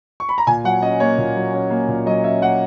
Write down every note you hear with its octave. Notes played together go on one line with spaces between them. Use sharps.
C#6
B5
A#5
A#2 G#5
F#3 F#5
C#4 D#5
A#3 C#5
A#2
F#3
C#4
A#3
A#2
F#3 D#5
C#4 E5
A#3 F#5